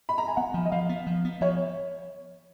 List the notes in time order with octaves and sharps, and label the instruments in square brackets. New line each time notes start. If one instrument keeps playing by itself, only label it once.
[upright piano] B5
A#5
G#5
[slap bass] B3 [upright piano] F#5
[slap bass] F3
[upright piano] D#5
[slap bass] F3 [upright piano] F5
[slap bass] B3
F3
B3
[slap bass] F3 [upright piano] C#5